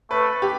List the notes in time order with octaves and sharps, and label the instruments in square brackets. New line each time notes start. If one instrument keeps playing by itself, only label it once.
[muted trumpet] A3 [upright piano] B4
[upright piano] G4